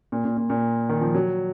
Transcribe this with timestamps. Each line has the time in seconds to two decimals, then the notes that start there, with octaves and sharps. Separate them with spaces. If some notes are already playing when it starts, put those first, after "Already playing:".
0.12 A#2
0.25 A#2
0.37 A#2
0.50 A#2
0.89 D#3
1.01 F3
1.15 F#3